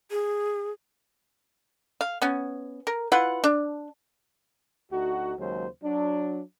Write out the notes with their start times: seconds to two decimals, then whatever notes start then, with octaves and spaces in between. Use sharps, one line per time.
0.11 G#4
2.01 F5
2.22 B3 C#4
2.87 A#4
3.12 E4 F4 B4 F#5
3.44 D4
4.92 D2 D#4 F#4
5.39 D#2 C#3 F#3 G#3 C5
5.84 F#3 D4